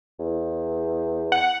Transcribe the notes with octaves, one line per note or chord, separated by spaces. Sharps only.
E2
F#5